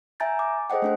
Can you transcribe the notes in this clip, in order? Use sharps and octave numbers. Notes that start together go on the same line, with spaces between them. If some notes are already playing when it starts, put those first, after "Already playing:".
E5 G#5 A#5 G6 A6
D6
G#4 A4 C5 D#5 F#5 G5
A3 D4 C5